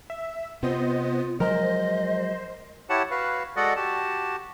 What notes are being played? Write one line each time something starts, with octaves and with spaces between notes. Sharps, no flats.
E5
C3 B3 F4 C5 D#5
F3 F#3 G#3 A#4 C5 D#5
E4 G4 C#5 F#5 A5
F#4 B4 F5
G#3 F#4 A4 D5 D#5 F#5
F#4 G4 A5